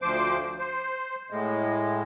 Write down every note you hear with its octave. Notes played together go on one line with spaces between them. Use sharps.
D2 F3 C5 D6
C5
A2 G#3